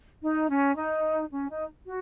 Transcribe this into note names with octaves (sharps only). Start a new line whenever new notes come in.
D#4
C#4
D#4
C#4
D#4
F#4